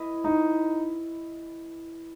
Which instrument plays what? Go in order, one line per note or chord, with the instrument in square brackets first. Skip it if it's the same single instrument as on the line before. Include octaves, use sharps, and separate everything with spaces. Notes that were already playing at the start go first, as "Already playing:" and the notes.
Already playing: [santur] E4 B4 D#5
[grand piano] D#4